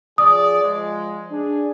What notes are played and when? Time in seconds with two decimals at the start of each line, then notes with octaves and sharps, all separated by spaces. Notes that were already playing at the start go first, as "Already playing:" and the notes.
0.18 F3 G#4 D5 D#6
0.62 F3 G#3
1.31 D4 G#4